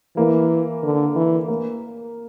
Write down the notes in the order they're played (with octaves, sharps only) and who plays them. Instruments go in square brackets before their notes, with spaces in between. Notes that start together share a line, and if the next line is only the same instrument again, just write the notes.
[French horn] E3 [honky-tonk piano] A#3
[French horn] D3
E3
[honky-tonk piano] A#3